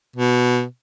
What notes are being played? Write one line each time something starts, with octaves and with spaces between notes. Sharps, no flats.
B2